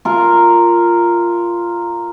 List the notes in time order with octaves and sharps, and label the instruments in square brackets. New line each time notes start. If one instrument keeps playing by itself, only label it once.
[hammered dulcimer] F4 A#4